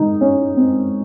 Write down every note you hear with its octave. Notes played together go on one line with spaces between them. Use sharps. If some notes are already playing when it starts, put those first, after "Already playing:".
Already playing: G#2 D#3 D#4
C#4
C4